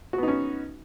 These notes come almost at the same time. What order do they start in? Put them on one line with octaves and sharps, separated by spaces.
F#4 B3 D#4 C#4